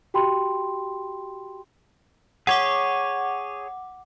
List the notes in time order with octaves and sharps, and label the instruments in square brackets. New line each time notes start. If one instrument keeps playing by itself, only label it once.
[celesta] F#4 G4 G5 B5 C6
[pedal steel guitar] G#4 C#5 [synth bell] F#5 D6